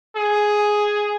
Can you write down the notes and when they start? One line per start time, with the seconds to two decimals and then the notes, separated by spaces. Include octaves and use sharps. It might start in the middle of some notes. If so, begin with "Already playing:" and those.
0.16 G#4